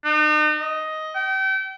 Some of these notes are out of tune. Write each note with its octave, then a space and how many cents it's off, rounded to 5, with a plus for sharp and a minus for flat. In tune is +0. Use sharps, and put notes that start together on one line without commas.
D#4 -40
D#5 +10
G5 -35